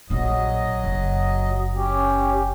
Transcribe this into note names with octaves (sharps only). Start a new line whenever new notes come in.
A#1 A#2 F#3 D#5
F#1
C#4 G4